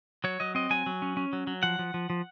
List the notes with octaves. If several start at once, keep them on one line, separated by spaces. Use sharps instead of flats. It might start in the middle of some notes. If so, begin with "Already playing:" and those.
F#3 C#5
F#3 D#5
C4 D#5
F#3 G#5
F#3
C#4
C#4
F#3
F#3
F3 F#5
F3
F3
F3